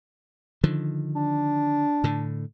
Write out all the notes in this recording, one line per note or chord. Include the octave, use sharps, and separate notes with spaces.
D3 D#3 F3
D4
A2 D3